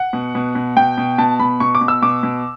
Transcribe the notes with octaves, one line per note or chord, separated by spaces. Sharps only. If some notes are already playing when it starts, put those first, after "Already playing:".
Already playing: F#5
B2
B2
B2
B2 G5
B2
B2 A5
B2 B5
B2 C#6
D6
B2
E6
B2 D6
B2